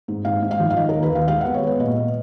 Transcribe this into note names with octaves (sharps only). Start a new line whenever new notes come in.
G#2
G#2 F5
G#2
F5
F3
F5
D#3 D#5
D#2 A#4
B4
D#2 F5
G#3 F5
B3 F#5
C#5
G#3 B4
A#2 D#5
A#2